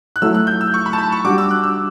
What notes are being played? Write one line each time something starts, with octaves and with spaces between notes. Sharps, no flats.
F#6
F#3 A3 E4 E6
F#6
G6
E6
C#6
B5
A5
B5
C#6
G3 D4 F#4 D6
E6
F#6
E6